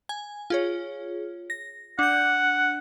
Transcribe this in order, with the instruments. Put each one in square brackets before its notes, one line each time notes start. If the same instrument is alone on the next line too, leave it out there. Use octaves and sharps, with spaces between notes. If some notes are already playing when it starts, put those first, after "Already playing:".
[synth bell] G#5
F4 G#4 C#5
A#6
[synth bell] D4 G6 [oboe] F#5